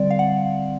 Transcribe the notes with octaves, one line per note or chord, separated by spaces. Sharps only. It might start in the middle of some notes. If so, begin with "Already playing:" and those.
Already playing: D3 G3 C4 D5
F5
F#5